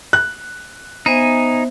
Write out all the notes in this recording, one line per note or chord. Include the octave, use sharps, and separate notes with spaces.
F#6
B3 D#4 C5 E5 G#5